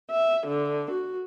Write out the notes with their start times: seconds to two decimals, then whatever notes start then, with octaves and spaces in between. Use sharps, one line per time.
0.10 E5
0.47 D3
0.91 F#4